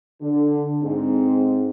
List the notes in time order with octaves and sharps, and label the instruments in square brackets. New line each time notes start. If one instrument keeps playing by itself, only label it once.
[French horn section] D3
G#2 C4